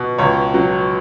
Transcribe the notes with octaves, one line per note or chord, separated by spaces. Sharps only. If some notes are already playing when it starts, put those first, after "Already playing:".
Already playing: B2
C#2 C#5
F#3